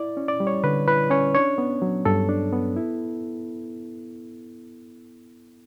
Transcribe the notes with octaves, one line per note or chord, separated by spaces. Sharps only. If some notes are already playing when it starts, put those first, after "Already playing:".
Already playing: E4 D5
C#4
D5
G3
C#5
D3 B4
E4 B4
C#4 C#5
D4 C#5
B3
F#3
G2 A4
D4
B3
E4